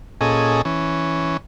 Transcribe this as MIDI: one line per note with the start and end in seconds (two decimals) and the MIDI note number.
0.21 0.62 46
0.21 0.62 61
0.21 0.62 68
0.21 0.62 69
0.21 0.62 75
0.65 1.37 52
0.65 1.37 61